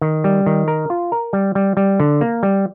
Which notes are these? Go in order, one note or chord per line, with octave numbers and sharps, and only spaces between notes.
D#3
G3
D#3
A#4
F4
A#4
G3
G3
G3
D3
A#3
G3